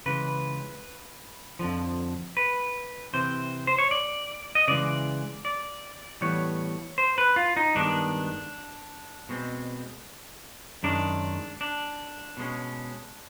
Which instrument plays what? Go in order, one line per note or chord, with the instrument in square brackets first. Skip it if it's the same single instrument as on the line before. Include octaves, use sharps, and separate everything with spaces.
[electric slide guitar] C#3 E3 G#3 B4
F2 D3 F3
B4
C3 E3 C4 C5
C5
C#5
D5
D#5
C#3 E3 G#3 D5
D5
A2 E3 G3 B3 C#5
C5
B4
F4
D#4
G2 D#3 G#3 B3 D4
B2 G#3 C4
F#2 D#3 G#3 C#4 D4
D4
B2 G#3 C#4